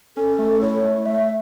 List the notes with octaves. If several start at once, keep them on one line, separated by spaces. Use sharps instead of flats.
C#4 A4
A3
E4 C#5
A3
A3 E5